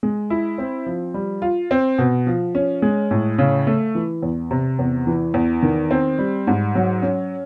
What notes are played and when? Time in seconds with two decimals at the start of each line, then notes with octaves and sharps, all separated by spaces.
0.03 G#3
0.30 E4
0.58 C4
0.86 F3
1.14 G3
1.42 F4
1.71 C4
1.98 B2
2.27 F3
2.55 C#4
2.82 G#3
3.11 A2
3.38 C#3
3.67 A3
3.95 E3
4.23 E2
4.51 C3
4.79 E2
5.07 E3
5.34 E2
5.63 D#3
5.91 C4
6.19 G3
6.47 G#2
6.75 F#3
7.02 C#4